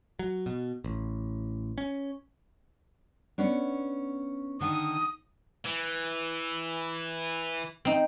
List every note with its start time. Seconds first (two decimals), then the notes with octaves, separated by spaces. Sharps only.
0.19 F#3
0.46 B2
0.84 A1
1.78 C#4
3.38 B3 C#4 D4
4.61 D3 D#3 D#6
5.65 E3
7.85 C4 D#4